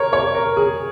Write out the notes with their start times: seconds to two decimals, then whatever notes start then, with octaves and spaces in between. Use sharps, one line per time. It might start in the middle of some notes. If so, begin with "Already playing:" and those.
Already playing: A#4 C#5
0.13 C#5
0.35 A#4
0.57 G#4